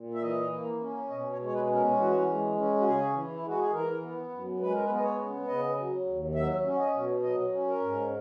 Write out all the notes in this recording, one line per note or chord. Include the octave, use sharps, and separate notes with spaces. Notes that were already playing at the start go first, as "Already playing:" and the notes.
Already playing: A#2
E5
E3 D#5
A#3
C#4
B2 D#5
C#5
G#3
C#5
B4
C#4
A#4
E3 F#4
G#3
C#4
F#4
C#3 G#4
E3
E4
G#3 F#4
G#4
E3 A#4
B3
F#2
G#3 B4
A#4
B4
B3
D#5
C#5
C#3
C#3 D#5
F#3
D#2
F#3 E5
C#4
D#5
B2
F#3 D#5
C#4
A#4
G#2